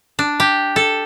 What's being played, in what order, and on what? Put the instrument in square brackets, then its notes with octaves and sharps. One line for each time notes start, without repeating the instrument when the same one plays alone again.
[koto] D4
G4
A4